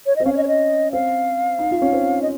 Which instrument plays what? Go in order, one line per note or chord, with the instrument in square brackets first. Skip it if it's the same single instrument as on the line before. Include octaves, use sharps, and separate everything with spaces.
[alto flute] C#5
[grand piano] C4 [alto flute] D#5
[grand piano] C#4 [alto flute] F5
[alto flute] C#5
D#5
C#5
D#5
[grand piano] C4 [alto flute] F5
[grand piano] D#4
F4
C#4
C4
[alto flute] D#5